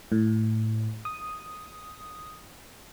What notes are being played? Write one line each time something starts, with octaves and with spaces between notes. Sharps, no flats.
A2
D#6